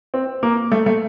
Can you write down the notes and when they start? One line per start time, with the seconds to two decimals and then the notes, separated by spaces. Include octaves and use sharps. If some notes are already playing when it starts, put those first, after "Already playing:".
0.14 C4
0.43 A#3
0.71 A3
0.86 A3